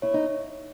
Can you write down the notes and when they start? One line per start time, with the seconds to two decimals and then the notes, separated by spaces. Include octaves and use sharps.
0.02 E4 C#5
0.14 D#4